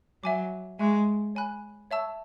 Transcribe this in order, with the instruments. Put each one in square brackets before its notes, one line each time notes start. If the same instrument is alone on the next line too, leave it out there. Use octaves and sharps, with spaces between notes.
[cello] F#3 [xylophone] E5 G#5 D6
[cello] G#3 [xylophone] E5 G#5 C#6 F#6
[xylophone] C#5 G#5 B5 F#6
C#5 E5 A5 C#6 E6